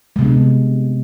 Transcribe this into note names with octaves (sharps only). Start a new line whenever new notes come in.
C3 G#3 B3 D4